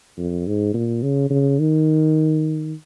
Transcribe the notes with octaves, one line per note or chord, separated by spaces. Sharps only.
F2
G#2
A#2
C#3
C#3
D#3